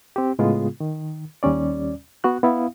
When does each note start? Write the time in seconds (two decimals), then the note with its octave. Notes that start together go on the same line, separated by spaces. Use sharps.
0.16 C4 G4
0.39 A2 C#3 G#3 B3 F4 G#4
0.80 D#3
1.43 D#2 G3 C#4 D5
2.24 B3 F#4 F#6
2.43 B3 E4 F5